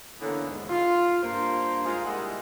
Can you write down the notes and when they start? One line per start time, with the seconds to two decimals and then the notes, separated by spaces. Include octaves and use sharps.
0.20 D3 E3 A#3 B3 C#4
0.49 D#2 G#2
0.69 F4
1.23 G2 A#3 C5
1.85 G#3 D#4 F4
2.06 A#2 G3 G#3 E4 D#5 F#5